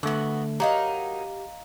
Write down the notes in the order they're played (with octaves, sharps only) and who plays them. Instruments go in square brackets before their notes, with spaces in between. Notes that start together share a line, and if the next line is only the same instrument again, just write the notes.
[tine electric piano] D3 A3 [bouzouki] B3 F#4
[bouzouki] F#3 D#4 A#4 [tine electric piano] G4 [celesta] D#5 F5 A#5